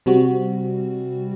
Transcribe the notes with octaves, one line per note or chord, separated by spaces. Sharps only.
C3 G3 C4 F#4